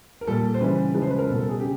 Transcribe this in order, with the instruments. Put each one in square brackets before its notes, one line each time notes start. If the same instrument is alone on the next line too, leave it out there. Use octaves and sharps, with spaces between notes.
[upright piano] A#4
A#2 G3 A4
C5
C#3 E3 G3 B4
C#3 F3 G#3 B4
C5
B4
A#4
G3 A4
B2
A4
G#4
C#3 G4